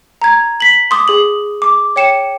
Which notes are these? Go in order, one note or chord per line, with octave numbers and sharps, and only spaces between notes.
A#5 G#6
B6 F#7
C6 D6 D#6
G#4 F#7
D6
C#5 G5 C#7 E7